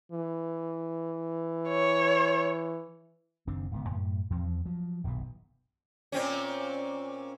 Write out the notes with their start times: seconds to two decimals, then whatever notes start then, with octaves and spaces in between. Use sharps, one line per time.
0.12 E3
1.69 C#5
3.47 F#1 D#3 C4 D4
3.72 D1 G#2 C#3 B3
3.88 F#2 A2
4.30 E2 F3 C4
4.66 F3 F#3
5.04 D#1 B1 G2 B2
6.12 A#2 C4 C#4